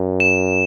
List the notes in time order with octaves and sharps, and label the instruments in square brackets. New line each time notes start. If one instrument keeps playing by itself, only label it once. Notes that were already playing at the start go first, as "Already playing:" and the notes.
Already playing: [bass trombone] F#2
[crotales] E7